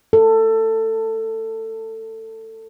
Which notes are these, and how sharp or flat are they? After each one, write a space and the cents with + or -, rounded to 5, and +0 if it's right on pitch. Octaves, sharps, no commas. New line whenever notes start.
A4 +20